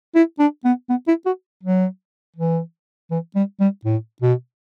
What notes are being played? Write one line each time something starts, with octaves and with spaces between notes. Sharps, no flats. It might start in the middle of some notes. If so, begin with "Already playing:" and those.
E4
D4
B3
B3
E4
F#4
F#3
E3
E3
G3
G3
A2
B2